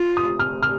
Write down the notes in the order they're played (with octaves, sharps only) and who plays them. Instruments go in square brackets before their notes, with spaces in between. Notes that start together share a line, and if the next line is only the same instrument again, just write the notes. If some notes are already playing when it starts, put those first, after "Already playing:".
Already playing: [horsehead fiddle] F4
[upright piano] D#6
F6
F6